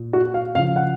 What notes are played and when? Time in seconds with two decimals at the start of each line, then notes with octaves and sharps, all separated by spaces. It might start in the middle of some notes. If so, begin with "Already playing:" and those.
Already playing: A#2
0.13 F#4
0.34 F5
0.55 C#3 F5
0.59 F3
0.76 F#5